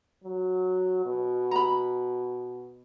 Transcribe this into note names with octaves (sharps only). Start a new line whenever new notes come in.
F#3
B2
A#5 B5